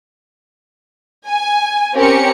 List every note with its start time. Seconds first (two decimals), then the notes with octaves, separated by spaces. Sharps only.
1.25 G#5
1.95 C4 C#4 G4 A#4 C#7